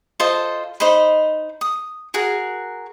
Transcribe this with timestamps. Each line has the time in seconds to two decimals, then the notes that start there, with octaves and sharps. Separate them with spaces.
0.20 F4 A4 C5 D#5
0.80 D#4 C5 D#5 B5
1.61 D#6
2.14 F#4 G#4 A#4